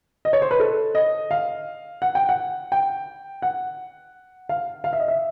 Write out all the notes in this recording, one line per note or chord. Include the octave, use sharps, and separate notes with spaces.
D#5
C#5
C5
B4
A4
D#5
F5
F#5
G5
F#5
G5
F#5
F5
F5
E5
D#5
E5